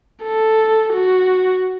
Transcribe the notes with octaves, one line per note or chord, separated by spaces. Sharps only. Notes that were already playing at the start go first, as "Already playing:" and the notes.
A4
F#4